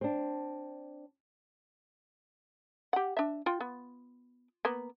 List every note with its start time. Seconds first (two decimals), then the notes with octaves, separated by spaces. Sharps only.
0.01 C4 D4
2.93 G4 F#5
3.17 D4 E5
3.46 F4 G5
3.61 B3
4.65 A#3 B3